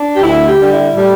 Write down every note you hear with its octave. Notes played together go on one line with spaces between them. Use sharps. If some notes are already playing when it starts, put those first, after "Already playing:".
Already playing: D4
G4
D2 E4
G4
D3 G3
E4
A2 G3